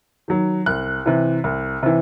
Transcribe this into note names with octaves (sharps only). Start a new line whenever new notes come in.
D#3 F#3
C2 F#6
C3 E3
C2
C3 E3